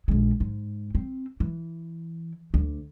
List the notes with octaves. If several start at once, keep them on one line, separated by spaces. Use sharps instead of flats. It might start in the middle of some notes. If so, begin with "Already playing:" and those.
A#1 G#3
G#2
C4
E3
D2